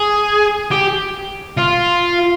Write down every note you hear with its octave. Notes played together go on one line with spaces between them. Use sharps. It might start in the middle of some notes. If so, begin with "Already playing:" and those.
Already playing: G#4
G4
F4